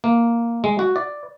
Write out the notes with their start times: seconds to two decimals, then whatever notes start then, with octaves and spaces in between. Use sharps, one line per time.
0.04 A#3
0.64 G#3
0.79 F#4
0.96 D5